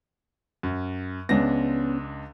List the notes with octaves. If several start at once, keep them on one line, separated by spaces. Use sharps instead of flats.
F#2
C#2 B3 C#4 D4 A#6